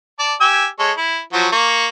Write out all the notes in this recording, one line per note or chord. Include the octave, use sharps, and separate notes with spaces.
D5 A5
G4 G#5 E6
G#3 A4 C#5
E4
F3 F#3 F#4
A#3 C#6